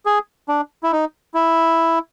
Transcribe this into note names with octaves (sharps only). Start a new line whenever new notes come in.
G#4
D4
E4
D#4
E4